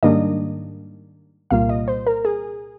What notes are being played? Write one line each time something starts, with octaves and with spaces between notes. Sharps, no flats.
G#2 D#3 G3 A#3 D4 D#5
C2 A#2 G3 A#3 F4 F5
D#5
C5
A#4
G#4